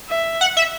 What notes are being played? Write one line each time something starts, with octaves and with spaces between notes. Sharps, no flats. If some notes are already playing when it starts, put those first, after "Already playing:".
E5
F#5
E5